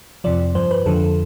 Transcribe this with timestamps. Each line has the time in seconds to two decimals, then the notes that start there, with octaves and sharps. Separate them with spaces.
0.24 F2 C3 F3 D5
0.55 G2 F3 C5
0.71 B4
0.86 F2 D3 F3 A4